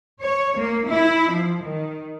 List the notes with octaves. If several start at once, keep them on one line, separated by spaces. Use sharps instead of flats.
C#5
A#3
E4
F3
D#3